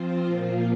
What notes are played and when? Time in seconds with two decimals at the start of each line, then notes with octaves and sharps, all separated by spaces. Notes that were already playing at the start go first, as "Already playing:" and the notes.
Already playing: F3 C4 F4 C5
0.26 A#2 F3 A#3 F4